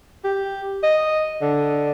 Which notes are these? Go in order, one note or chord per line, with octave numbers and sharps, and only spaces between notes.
G4
D#5
D3